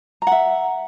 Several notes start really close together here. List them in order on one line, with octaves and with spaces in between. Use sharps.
A#5 F#5 E5